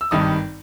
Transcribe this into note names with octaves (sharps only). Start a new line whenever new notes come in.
E6
G#1 G2 D#3 G3 D#6